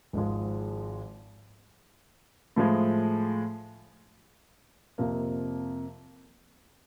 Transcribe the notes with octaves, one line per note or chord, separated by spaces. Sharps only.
G#1 G#2 F3 G#3
A2 F3 G#3
F2 C3 F3 A#3